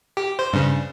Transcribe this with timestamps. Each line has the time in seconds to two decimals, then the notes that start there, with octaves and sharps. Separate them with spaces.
0.17 G4
0.39 C5
0.53 G2 C#3